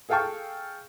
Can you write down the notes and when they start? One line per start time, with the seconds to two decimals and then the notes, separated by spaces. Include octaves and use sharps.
0.09 G#4 A4 F5 G5 A5 C#6